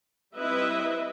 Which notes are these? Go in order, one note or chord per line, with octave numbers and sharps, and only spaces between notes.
G3 C4 E4 B4 D#5 E5